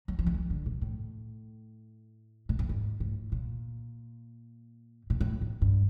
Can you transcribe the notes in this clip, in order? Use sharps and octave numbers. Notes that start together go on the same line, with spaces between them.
F#3
F3
D3
D#3
D3
A#2
A2
A#2
A2
G#2
A2
A#2
A#2
A2
G#2
G2